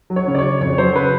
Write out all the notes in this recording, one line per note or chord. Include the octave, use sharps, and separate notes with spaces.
F#3
C#5
C#3
D5
C#5
C#3
F2 C#5
F#3 C5
C#3 B4